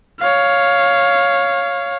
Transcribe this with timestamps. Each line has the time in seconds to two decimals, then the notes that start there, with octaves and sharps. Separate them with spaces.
0.20 C#5 F5